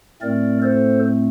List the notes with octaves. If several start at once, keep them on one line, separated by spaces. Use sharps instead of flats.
A2 A3 C4 A#4 D5
A4 C5